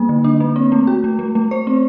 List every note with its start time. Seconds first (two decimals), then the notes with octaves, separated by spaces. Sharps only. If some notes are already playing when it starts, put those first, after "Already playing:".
Already playing: G3 A#3
0.09 D3
0.24 D4
0.41 A#3
0.56 C4
0.72 A3
0.87 F#4
1.04 A3
1.19 A3
1.35 A3
1.51 C5
1.67 C4